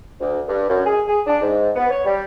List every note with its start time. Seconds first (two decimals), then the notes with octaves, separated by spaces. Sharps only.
0.20 D2
0.48 G2
0.69 F#2
0.86 G#4
1.07 G#4
1.27 D4
1.41 G#2
1.76 B3
1.90 C#5
2.05 G3